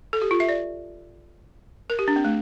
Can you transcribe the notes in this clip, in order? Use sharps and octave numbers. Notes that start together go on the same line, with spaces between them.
A4
G4
F4
E5
D5
A#4
G4
D4
C4
A3